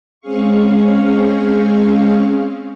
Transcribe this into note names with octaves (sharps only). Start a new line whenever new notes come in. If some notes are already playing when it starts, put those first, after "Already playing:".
G#3 C4 C#4 G#4 F5 C#6